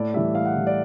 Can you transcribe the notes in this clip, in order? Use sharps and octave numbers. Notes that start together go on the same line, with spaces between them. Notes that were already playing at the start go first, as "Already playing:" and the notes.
Already playing: A2 D5
E3 G3 E5
A2 F5
F#5
E3 G3
D5